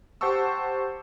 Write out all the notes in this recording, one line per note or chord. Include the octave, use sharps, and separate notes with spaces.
G4 C5 F#5 A5 C#6 E6